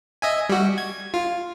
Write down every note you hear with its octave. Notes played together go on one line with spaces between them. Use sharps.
D#5 E5 G#5
G3 F#4
G#6
F4